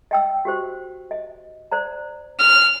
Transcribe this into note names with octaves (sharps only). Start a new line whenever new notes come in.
D#5 G5 E6
F#4 G4 C5
D#5
C5 D5 A#5
F6